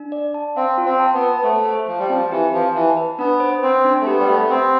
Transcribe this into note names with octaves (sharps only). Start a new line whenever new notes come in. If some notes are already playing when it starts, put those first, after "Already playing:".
Already playing: D4
D5
A5
C4 F5
F4
C4
A5
B3
A5
B3
A3 C5
C5
F3 C5
G3
F3 C4
E3 G4
F3 B4
E3 A5
B4
B3 D4
C5
C4 C5
D4
A3
B3 G4
G3
A3 E5
B3
C4 E5